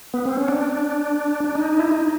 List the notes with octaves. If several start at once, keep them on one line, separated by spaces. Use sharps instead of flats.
B3
C4
C#4
D4
D4
D#4
E4
D#4